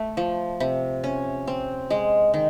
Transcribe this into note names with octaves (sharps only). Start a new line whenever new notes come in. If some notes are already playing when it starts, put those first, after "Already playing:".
Already playing: A3
F3
C3
C#4
C4
G#3
D#3